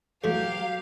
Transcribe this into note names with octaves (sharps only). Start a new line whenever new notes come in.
E2 B2 F#3 A3 G4 F5